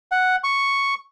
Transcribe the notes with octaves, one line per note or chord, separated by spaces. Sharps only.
F#5
C#6